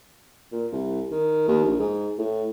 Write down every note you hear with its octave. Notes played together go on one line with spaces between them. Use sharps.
A#2
C2
D#3
D#2
A#1
G#2
A2